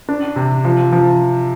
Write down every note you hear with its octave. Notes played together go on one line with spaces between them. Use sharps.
D4
C3
F3
F3